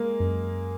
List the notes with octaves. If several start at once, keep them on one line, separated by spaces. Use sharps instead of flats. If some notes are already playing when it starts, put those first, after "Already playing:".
Already playing: G#3 A#3
F#2